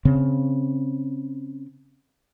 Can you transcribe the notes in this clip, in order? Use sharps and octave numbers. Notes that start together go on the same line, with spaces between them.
C#3 C4